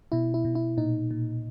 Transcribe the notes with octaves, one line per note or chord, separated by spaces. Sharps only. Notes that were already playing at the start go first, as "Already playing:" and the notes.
B2 E4
E4
B2
E4
A#2 D#4
A#2